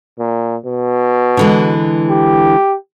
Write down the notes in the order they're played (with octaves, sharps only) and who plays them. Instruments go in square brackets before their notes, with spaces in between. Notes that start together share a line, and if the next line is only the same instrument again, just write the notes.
[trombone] A#2
B2
[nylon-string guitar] D3 E3 G#3
[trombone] G4